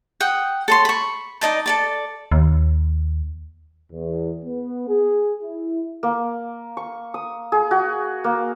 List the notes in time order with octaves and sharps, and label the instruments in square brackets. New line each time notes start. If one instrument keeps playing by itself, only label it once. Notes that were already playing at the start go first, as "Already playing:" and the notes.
[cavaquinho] F#5 G5 D#6
A4 C#5 C6
B5 C#6
D#4 D5 D#5 A5
A4 D5 A5
[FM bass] D#2
[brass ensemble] E2
B3
G#4
E4
[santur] A#3
C#6
D#6
G#4
F#4
A#3